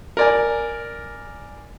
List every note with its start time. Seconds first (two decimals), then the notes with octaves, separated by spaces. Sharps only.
0.17 A#4 D5 G#5